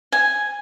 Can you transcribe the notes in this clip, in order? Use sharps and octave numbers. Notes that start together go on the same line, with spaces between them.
G#5